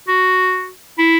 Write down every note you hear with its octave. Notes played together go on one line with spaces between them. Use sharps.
F#4
E4